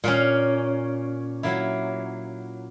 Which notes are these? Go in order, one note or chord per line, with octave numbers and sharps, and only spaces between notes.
A#2 A#3 C#4
F#3 A#3 E4